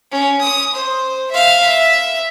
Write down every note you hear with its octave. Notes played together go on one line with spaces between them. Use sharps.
C#4
D#6
C5
E5 F5
E5